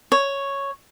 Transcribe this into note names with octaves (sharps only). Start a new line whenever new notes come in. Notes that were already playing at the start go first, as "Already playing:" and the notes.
C#5